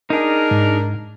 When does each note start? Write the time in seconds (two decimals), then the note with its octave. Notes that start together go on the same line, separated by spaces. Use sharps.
0.10 D4 D#4 G#4 A#4
0.51 G#2